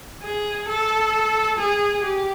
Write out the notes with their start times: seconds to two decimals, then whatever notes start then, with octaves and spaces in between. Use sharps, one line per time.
0.22 G#4
0.68 A4
1.58 G#4
2.03 G4